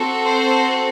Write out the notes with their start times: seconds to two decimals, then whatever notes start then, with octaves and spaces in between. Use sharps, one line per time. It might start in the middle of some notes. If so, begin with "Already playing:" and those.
Already playing: C4 F#4 A4
0.22 C5